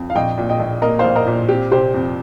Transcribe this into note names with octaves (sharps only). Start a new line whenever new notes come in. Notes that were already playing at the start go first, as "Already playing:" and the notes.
Already playing: F2
F5
A#1 D#5 G5
A#2
D#5 G5
A#1
A#3 A#4 D#5
A#1 C5 F5
A#4 D#5
A#2
C4 G4
C3 G4 C5
F2